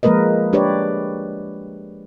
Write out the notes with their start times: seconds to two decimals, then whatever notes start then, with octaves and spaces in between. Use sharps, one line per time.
0.03 F3 G#3 A#3 A#4 B4 D#5
0.53 D4 G4 B4 C#5 D5